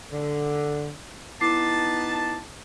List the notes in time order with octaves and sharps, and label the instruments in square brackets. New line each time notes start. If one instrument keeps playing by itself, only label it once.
[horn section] D3
[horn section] B3 D#4 A5 [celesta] E4 D6 C7